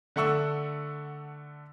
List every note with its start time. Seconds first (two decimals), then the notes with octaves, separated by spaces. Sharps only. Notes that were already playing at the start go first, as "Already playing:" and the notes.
0.16 D3 A3 F#5 C#6 E6